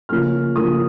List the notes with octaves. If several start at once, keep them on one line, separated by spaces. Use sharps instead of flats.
C#3 F3 A#3 C#4 F6
C#3 F3 A#3 C#4 D#6